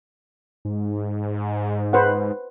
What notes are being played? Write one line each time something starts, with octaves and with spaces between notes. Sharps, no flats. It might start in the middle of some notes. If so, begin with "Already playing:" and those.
G#2
B4 C5 F#5